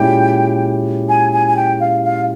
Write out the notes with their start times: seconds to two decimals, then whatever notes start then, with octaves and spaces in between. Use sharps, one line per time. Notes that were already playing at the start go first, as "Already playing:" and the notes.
Already playing: A#2 G#3 C#4 E4 G4 G5
1.09 G#5
1.33 G#5
1.48 G#5
1.56 G5
1.80 F5
2.04 F5